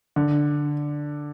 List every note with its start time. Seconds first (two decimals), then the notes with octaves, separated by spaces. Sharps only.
0.16 D3